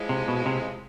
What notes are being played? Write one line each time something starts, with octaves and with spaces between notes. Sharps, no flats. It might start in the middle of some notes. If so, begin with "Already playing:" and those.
Already playing: A2 F3 G#3
C3
B2
C3